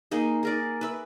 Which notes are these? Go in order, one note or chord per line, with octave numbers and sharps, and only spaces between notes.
A#3 D#4 G#4
G#4 A#4 D5
B4 E5